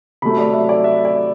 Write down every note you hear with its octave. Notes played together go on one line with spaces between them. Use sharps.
C3 F#3 A3 B5
D5
E5
D5
E5
D5